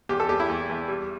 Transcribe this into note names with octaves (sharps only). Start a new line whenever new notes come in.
E2 G4
A4
E2 G4
E4
E2
E2
G3